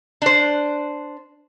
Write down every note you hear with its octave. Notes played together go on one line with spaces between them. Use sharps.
D4 C5